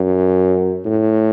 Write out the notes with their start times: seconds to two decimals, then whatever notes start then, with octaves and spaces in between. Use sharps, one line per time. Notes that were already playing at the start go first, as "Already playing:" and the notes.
Already playing: F#2
0.85 A2